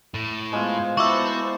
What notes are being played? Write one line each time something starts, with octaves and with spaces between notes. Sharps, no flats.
A2
G#3 B3 F4 C5 G#5
B3 E4 F#4 C5 A5 C#6 D6 E6